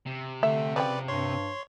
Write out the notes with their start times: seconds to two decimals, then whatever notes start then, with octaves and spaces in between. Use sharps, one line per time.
0.06 C3
0.43 D3 A3 E5
0.76 C#3 F3 B4 D5 G5
1.08 G2 C#5 C6